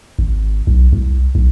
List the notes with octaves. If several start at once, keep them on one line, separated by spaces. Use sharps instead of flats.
G#1
B1
C2
B1